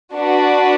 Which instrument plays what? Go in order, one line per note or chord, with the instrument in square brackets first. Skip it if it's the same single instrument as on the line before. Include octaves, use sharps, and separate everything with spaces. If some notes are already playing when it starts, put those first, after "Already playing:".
[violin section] D4 F#4 B4 D5